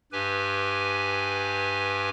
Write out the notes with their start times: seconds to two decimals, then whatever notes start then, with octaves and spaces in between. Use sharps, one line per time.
0.12 G2 G4 B4 G#5